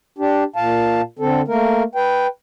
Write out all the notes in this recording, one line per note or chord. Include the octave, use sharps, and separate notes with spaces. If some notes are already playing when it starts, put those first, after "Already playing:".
D4 G4
A#2 F5 A5
D3 C4 A4
A3 A#3 A#4
B4 G5